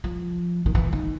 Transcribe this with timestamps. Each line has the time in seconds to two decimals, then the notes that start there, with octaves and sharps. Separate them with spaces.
0.04 F3
0.66 D#3
0.75 E3
0.93 D#3